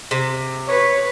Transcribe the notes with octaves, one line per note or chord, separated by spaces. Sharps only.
C3
B4 C#5